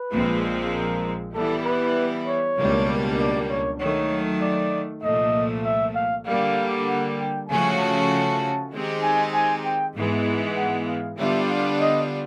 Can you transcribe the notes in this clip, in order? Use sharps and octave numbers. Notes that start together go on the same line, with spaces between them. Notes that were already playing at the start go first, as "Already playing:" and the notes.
Already playing: B4
A#1 A#2 F3 G#3 C4
A#4
E3 G3 B3 E4 A4
B4
C#5
C#2 B2 G3 A#3 D4
D5
C#5
D#3 F#3 A3 C#5
D5
C2 A#2 F3 A3 D#5
E5
F5
D3 G3 A#3 F5
F#5
G5
C#3 F3 A3 C#4 F#4 G#5
A5
D#3 G#3 C4 D#4 G4
G#5
G#5
G5
G#2 E3 G#3 B3
F#5
F5
D3 G3 B3 D4 F4 E5
F5
D#5